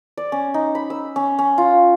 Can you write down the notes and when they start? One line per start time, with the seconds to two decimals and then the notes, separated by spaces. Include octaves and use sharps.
0.17 D5
0.32 C#4
0.54 D#4
0.75 B5
0.90 E6
1.16 C#4
1.39 C#4
1.58 F4